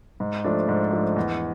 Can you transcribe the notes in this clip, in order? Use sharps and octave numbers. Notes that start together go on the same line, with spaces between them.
G#2
F3 A3 D4
G#2
F3 A3 D4
E2